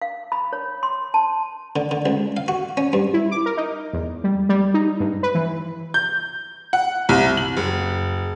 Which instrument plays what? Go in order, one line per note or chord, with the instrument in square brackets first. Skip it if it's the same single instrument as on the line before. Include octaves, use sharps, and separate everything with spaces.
[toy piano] F5
B5
C#5
C6
A5
[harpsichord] D3
D3
C#2
F5
F#4
C#4
G2
[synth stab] E4
D6
A#4
D#4
E2
G3
G3
D#4
G2
B4
E3
[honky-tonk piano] G6
F#5
C2
F#7
F#1